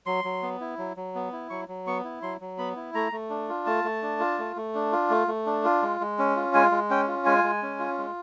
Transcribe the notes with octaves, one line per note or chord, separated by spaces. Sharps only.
F#3 C6
F#3
B3
E4
F#3
F#3
B3
E4
F#3 C#6
F#3
B3 C#6
E4
F#3 C6
F#3
B3 B5
E4
A3 A#5
A3
D4
F4
A3 A5
A3
D4
F4
A3
A3
D4
F4
A3
A3
D4
F4
G#3
G#3
C#4
F4
G#3 G#5
G#3
C#4 G5
F4
G#3 G#5
G#3
C#4
F4
G#3